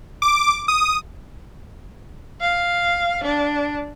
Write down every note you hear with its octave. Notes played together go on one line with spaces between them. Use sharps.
D6
D#6
F5
D4